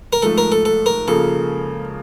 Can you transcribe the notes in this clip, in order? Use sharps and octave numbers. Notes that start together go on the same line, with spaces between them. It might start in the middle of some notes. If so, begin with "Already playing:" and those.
A#4
G#2 F3 A3 A4
A#4
A4
A4
A#4
C#3 F3 A#3 A4